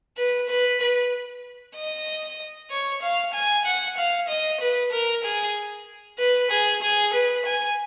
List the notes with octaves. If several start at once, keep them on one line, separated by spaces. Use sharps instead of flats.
B4
B4
B4
D#5
C#5
F5
G#5
F#5
F5
D#5
B4
A#4
G#4
B4
G#4
G#4
B4
G#5